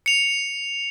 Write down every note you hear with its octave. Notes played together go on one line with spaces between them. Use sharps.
C#7 F7